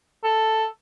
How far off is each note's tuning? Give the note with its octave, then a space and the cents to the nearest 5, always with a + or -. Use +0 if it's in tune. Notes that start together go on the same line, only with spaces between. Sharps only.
A4 +5